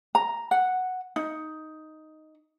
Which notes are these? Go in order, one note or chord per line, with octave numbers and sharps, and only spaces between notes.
A#5
F#5
D#4